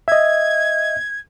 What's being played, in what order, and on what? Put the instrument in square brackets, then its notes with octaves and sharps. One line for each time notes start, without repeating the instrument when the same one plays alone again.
[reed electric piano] D#5 E5 [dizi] G#6